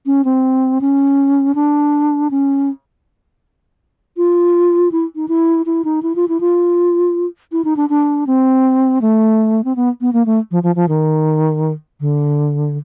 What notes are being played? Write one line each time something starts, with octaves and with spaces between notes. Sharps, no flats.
C#4
C4
C#4
D4
C#4
F4
E4
D#4
E4
E4
D#4
E4
F4
E4
F4
E4
D#4
D4
D4
C4
A3
C4
B3
B3
A#3
A3
F3
F3
F3
D#3
D3